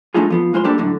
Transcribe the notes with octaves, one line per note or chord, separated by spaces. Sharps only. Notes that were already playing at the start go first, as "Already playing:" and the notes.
G#3 A3 D4 D#4 F4 G#4
F3 B3 F4
C2 G#3 F4 C5 C6
G3 A#3 D4 G4 A4 D5
F#2 A2 D3